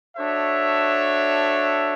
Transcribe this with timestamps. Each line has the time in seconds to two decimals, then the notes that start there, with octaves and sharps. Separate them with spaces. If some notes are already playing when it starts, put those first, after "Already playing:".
0.16 D4 F#4 A4 C#5 E5